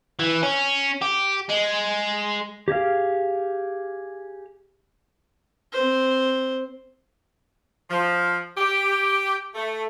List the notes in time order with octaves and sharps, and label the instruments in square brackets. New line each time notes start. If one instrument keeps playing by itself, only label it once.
[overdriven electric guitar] E3
C#4
G4
G#3
[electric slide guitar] G4 G#4 D#5 F5
[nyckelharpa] C4 C5
[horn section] F3
G4
A3